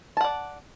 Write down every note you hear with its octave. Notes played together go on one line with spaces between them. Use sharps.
D5 F#5 A5